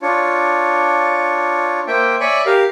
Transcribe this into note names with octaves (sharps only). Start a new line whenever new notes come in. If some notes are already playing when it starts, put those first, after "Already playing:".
D4 F4 C#5
A#3 C5 E5 G5
C#5 D5 E5 G#5 B5 C#6
G4 A#4 F5